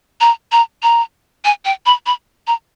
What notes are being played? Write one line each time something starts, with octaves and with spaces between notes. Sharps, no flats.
A#5
A#5
A#5
G#5
G5
B5
B5
A#5